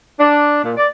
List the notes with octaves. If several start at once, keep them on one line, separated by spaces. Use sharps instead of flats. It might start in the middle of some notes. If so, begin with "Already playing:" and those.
D4
A#2
D5